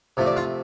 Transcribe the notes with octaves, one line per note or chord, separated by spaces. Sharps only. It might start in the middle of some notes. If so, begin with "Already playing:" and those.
C3 F3 A3
D5
F4 F5